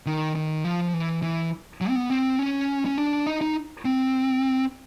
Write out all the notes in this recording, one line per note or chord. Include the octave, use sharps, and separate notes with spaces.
D#3
D#3
F3
E3
E3
F#3
C4
B3
C4
C#4
C#4
D4
D#4
D#4
C4